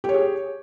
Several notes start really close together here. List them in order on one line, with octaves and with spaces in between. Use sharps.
G4 C#5 G#4